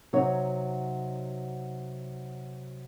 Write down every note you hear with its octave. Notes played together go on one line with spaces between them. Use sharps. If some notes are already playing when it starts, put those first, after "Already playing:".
C3 F#3 D#4 C#5